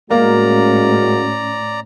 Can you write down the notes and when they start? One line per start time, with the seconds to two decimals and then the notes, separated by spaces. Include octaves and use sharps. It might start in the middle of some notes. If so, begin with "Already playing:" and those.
0.10 A2 G#3 A#3 C#4 F#4 D5 F5 A#5